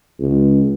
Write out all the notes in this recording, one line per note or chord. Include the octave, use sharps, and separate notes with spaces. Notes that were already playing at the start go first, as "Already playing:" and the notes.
C#2